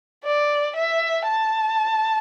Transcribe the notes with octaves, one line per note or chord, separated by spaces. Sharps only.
D5
E5
A5